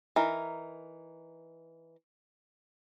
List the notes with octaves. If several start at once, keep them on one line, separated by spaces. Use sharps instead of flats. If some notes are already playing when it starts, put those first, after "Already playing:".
E3 D#4 A#4